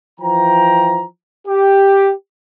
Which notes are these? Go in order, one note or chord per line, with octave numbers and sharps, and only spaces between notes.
E3 F3 G5 A#5
G4